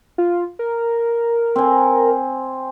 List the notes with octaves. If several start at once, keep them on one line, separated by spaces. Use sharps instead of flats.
F4
A#4
C4 G#5